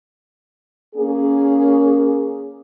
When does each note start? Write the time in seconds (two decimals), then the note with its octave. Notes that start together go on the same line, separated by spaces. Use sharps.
0.95 A#3 C#4 G#4